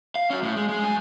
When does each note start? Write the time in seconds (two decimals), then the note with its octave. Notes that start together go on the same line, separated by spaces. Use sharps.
0.15 F5
0.30 C#4 F#4
0.43 A2
0.56 G#3
0.69 G#3
0.84 F#2 G#5